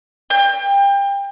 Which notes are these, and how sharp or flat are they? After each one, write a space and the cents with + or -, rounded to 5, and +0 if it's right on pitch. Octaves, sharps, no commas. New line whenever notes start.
G5 +30